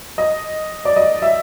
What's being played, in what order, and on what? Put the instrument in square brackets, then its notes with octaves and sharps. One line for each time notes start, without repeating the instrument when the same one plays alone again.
[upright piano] D#5
D5
D#5
E5